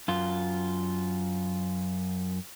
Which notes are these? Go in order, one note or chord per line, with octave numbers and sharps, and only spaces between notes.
F#2 F4